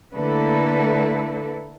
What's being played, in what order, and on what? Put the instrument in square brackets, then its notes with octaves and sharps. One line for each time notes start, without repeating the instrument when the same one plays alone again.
[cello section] D3 A3 A#3 E4 A4 B4